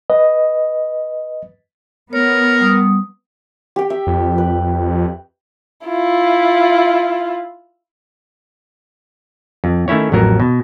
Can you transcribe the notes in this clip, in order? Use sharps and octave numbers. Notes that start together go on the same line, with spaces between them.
B4 D#5
B3 A#4 C#5
G3 D#6
G4 G5
E5
F2
B4
E4 F4
F2
D#3 A3 C#4 E4 C#5
A1 F2 F#3 A#4
B2